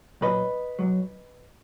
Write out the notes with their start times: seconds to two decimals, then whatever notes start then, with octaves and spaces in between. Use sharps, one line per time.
0.21 B1 A#2 F#3 B4 D#5
0.79 B1 A#2 F#3